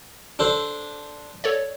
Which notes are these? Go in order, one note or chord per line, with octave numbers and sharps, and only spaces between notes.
D4 A4 C5
A4 C#5 D5